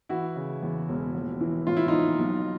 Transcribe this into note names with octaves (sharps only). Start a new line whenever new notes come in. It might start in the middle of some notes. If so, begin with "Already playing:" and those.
E3 E4 F#4
C#3
E2
E1
A#1
E3
A2 F4
E4
A#1 D#4 F4
B1